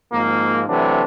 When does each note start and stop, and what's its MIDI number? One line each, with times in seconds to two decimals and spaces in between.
0.12 0.62 32
0.12 0.62 44
0.12 0.62 53
0.12 0.62 58
0.68 1.02 48
0.68 1.02 52
0.68 1.02 54
0.68 1.02 57
0.68 1.02 62